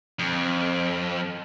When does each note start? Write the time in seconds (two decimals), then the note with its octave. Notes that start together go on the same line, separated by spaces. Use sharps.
0.19 F2